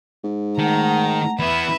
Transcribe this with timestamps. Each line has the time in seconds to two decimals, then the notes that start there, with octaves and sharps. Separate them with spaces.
0.24 G#2
0.58 D#3 A3 F#5 A#5
1.39 E3 B3 B4 E5 B5